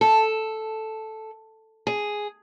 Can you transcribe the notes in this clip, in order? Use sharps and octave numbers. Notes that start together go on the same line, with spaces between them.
A4
G#4